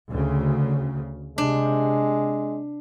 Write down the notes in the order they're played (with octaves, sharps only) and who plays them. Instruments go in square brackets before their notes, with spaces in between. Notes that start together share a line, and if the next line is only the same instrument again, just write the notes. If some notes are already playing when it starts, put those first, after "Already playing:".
[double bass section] D2 C#3
[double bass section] C3 [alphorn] G#3 [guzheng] D4